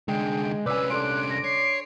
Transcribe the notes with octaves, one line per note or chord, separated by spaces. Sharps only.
C2 D3 G#3 G5
C2 C#4 B4 D5 G#5 E6
D4 A4 C6 F#6 D7
A#6
C#5 C7